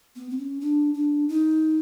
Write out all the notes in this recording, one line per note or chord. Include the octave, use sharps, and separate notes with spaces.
B3
C4
C#4
D4
D4
D#4